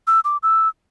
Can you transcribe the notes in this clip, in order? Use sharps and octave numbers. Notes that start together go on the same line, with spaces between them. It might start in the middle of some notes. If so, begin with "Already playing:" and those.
E6
D6
E6